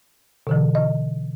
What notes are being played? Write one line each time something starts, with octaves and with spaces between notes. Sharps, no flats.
B2 D3 E3
D#5